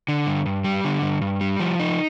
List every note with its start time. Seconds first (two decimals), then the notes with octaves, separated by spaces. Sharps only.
0.08 D3
0.27 G2
0.46 G2
0.64 G3
0.85 D3
1.02 G2
1.21 G2
1.41 G3
1.60 F3
1.80 D#4